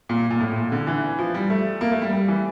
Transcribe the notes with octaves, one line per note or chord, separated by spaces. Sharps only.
A#2
A#2
A2
A#2
D3
E3
F3
G3
A3
A#3
A3
G3
G3
E3